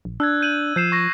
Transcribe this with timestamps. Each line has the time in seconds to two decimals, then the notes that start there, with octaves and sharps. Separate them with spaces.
0.05 A#1
0.20 D4 E6 F#6 G#6
0.41 G6 D#7 F#7
0.76 F3 G6 C7 E7
0.92 C#6 A#6